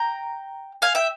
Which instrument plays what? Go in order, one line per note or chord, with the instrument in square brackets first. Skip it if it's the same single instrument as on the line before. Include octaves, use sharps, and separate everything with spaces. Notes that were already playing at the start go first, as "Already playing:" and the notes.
Already playing: [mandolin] G5 A#5
F5 G#5
E5 G5